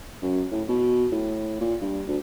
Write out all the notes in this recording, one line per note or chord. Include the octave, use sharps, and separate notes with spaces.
F#2
A2
B2
A2
A#2
G2
D2